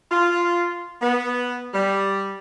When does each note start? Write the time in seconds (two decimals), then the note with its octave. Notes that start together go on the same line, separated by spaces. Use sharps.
0.12 F4
1.02 B3
1.73 G3